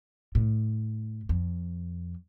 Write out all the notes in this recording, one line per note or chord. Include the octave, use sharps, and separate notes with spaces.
A2
F2